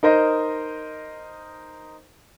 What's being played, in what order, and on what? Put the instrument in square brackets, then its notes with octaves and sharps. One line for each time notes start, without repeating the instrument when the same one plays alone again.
[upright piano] D#4 A#4 C5 D#5